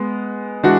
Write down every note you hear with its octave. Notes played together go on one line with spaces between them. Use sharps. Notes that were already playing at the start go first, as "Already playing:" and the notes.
Already playing: G#3 B3
E3 G#3 D4 F#4